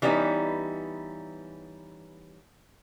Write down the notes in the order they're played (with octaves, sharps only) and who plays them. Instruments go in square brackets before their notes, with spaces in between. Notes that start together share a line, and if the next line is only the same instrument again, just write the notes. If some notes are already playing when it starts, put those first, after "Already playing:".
[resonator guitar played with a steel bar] E3 G3 B3 C#4 D#4